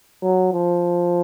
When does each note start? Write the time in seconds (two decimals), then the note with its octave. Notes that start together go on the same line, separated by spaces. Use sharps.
0.22 F#3
0.53 F3